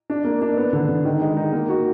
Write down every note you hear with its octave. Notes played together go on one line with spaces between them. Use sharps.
D4
A#3
D4
B3
D3
D3
D#3
G#3
D#4
A#3
F#4